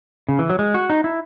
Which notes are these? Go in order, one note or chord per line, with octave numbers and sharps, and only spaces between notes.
C#3
E3
F#3
G#3
F#4
D#4
E4